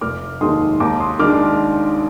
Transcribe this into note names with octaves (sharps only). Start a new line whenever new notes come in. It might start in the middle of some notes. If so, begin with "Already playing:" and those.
F1 D6 F6
D#2 D#3 G#3 D#4 C6 D#6
D#2 A#5 D6
C6 D#6
D#3 G#3 D4 D6 F6